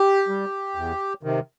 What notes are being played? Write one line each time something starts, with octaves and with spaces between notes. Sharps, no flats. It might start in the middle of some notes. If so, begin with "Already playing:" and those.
Already playing: G4
G3
E2
C3 D#3